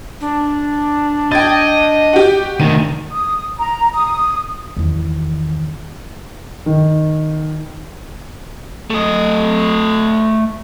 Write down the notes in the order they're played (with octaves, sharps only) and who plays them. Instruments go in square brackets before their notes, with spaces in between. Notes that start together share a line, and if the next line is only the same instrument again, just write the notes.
[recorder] D4
[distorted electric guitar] D#5 [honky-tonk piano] G5 G#6 A6
[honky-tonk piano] F#4 G4
[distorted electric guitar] D2 D#3 [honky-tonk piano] D#7
[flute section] D#6
A#5
D#6
[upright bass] E2 D#3
[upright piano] D#3
[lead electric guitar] A3 D#5